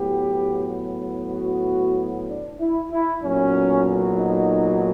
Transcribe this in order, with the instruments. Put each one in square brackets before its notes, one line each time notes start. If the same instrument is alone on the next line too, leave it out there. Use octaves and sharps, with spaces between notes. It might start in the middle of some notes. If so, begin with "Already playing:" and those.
Already playing: [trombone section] A2 F#3 B3 G4
F#4
D4
E4
E4
B1 A#2 F#3 C#4
D#4